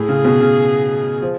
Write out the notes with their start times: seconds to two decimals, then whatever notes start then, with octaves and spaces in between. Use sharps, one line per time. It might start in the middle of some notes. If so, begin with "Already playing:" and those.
Already playing: A2 G#4
0.09 C#3
0.25 B2
0.41 C#3
1.22 F3